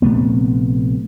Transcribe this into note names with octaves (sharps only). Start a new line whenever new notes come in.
A#1 C3 A3 B3